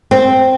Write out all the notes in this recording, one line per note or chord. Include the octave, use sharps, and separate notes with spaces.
C4